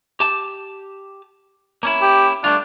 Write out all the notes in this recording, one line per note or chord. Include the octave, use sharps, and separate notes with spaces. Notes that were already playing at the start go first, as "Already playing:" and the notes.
G4 A5
A#3 C#4 E4
G4
G3 A3 D4 F4